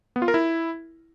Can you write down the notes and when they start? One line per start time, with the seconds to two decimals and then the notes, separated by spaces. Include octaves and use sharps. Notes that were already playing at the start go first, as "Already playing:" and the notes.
0.16 B3
0.22 F4
0.28 A#4
0.34 E4